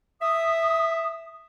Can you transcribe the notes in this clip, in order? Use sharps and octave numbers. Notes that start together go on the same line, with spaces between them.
E5 D#6